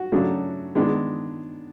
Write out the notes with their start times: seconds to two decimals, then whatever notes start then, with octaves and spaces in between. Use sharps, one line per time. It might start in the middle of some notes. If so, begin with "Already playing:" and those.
Already playing: F#4
0.12 C#3 F#3 A3 D4
0.75 D#3 G#3 B3 D4